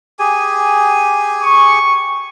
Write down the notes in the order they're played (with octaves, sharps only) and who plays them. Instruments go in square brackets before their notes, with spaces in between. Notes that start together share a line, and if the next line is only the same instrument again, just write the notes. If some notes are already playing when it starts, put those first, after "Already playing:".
[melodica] G4 G#4 G#5
[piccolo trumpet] C#6